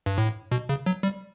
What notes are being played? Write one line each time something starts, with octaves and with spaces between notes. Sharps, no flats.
G2
A2
B2
C#3
F#3
G3